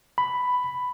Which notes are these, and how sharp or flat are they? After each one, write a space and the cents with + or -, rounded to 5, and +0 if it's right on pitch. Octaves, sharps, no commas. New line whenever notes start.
B5 +5